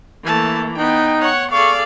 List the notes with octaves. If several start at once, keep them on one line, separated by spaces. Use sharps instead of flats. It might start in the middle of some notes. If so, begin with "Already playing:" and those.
E3 A3 A#3 A5
B3 D#4 G5
C#5 F#5 C#6
G#4 A4 D5 F5 C#6